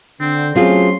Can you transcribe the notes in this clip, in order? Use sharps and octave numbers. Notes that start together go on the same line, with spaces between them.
D3 C4
F#3 A3 C4 C#4 F4 G#4 C6